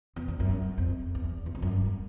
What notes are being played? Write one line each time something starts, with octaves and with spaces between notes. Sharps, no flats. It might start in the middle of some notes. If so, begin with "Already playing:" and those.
E2
F2
F#2
F2
E2
E2
F2
F#2
G2